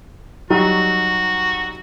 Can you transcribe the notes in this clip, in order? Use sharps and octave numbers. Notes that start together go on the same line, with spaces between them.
F#3 G3 D#4 F#4